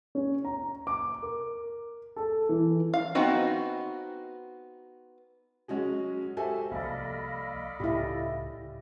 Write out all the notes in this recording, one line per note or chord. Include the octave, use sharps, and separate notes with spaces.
C#4
A#5
D6
A#4
A4
E3
F5
B3 C4 D#4 F#4 B4
F#3 G#3 C#4 F#4 G#4
F#4 G4 A4 C5 E5 G#5
C2 F3 A#3 A4 D5 D#5 F5 B5
C#2 A2 C#3 E4 G4